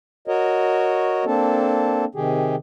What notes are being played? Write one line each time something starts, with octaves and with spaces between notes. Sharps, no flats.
F#4 A#4 C#5 D#5
A#3 C4 D4 A4
C3 D#3 G4 G#4